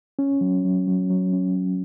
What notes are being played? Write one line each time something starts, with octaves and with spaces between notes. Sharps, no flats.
C#4
F#3
F#3
F#3
F#3
C#4
F#3